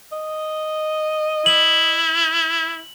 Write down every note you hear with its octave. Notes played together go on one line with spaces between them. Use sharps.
D#5
E4 F#7